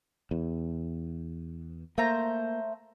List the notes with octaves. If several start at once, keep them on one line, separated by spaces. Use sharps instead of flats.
E2
A3 A#3 C5 A#5